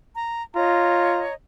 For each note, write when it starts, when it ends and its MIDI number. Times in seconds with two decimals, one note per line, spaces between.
0.16 0.42 82
0.56 1.26 65
0.56 1.33 73
0.56 1.33 75
0.56 1.33 82